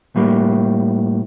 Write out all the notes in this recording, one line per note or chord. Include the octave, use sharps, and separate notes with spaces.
A2 G3 A#3